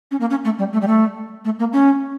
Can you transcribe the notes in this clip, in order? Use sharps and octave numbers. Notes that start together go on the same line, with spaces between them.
C#4
A#3
C#4
A3
G3
A3
G3
A3
A3
A#3
C#4